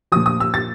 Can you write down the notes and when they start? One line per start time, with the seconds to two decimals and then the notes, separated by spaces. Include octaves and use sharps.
0.12 A#2 F3 D#6
0.26 D#6
0.40 E6
0.54 A6